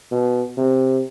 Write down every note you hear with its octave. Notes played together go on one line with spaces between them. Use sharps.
B2
C3